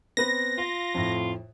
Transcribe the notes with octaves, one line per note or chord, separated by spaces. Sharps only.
B3 C4 B4 A#6
F4 F5
F2 A2